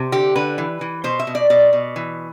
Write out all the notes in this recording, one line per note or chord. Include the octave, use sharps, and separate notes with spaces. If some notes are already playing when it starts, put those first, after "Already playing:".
Already playing: C3
D3 G4
D3 B4
E3
E3
B2 C5
E5
B2
D5
B2 D5
B2
E3